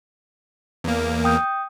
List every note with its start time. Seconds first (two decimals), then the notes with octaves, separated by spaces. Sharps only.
0.84 E2 A#3
1.24 G5 D#6 G6